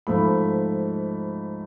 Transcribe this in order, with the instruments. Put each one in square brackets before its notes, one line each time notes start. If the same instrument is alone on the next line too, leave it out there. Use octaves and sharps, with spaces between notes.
[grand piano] G#2 F3 A3 B5